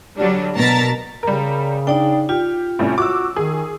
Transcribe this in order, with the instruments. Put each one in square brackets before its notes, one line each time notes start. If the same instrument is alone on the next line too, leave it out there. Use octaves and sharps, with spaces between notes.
[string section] D3 F#3 G3 D4
B2 A#4 A5 A#5 A6 B6
[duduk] C#3 [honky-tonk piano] G3 A#4
[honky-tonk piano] D4 [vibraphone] D#4 D5 G5
[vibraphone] F4 [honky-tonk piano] G4
[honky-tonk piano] A2 C3 G3 [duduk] C#4
[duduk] F#4 [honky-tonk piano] D6 E6
[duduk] D#3 [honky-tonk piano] G#4